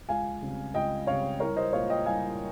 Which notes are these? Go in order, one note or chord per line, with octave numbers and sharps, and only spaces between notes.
C#2 F5 G#5
C#3 G3 C4
C#2 D#5 G5
C#3 G3 C4 C#5 F5
C2 A#4 C#5
C5 D#5
A#2 G#3 C#5 F5
D#5 G5
C2 F5 G#5